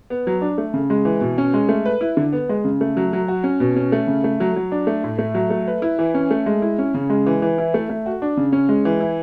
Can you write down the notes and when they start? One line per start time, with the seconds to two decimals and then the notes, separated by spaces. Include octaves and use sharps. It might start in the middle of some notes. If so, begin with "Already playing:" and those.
0.10 B3
0.27 F#3
0.41 D4
0.58 A3
0.74 C#3
0.90 G#3
1.05 E3
1.21 B2
1.38 C#4
1.54 G#3
1.69 A3
1.86 B4
2.01 E4
2.17 D3
2.32 B3
2.49 G#3
2.64 C#3
2.81 A3
2.97 F#3
3.13 F#3
3.28 F#4
3.44 C#4
3.60 B2
3.76 C#4
3.92 A3
4.07 C#3
4.24 A3
4.40 F#3
4.56 F#3
4.72 D4
4.87 A3
5.04 A2
5.18 A3
5.34 F#3
5.50 A3
5.67 B4
5.82 E4
5.99 E3
6.14 C#4
6.31 A3
6.46 G#3
6.62 E4
6.78 C#4
6.94 C#3
7.10 G#3
7.26 E3
7.42 E3
7.58 E4
7.74 A3
7.90 A3
8.06 F#4
8.22 D4
8.37 C#3
8.52 C#4
8.69 G#3
8.85 E3
9.00 E4